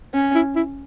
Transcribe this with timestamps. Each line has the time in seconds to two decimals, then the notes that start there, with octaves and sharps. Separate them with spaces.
0.14 C#4
0.35 E4
0.56 E4